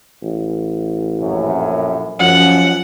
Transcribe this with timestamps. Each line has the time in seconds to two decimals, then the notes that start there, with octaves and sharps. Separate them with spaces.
0.22 A1
1.21 A#1 F#2 A2
2.20 F#2 F3 C#4 F#5